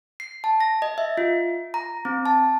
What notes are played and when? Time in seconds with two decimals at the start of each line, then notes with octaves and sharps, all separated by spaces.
0.20 C7
0.44 A5
0.61 A#6
0.82 D#5
0.98 E5
1.17 F4
1.74 A#5
2.05 C4
2.25 A5